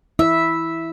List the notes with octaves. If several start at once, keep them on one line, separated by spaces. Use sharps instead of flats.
E4 E5